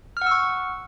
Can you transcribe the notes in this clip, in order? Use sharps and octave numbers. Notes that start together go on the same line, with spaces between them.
F#5 C#6 E6 F6